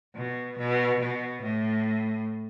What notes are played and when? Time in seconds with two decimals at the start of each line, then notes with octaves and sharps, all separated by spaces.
0.16 B2
0.58 B2
1.00 B2
1.42 A2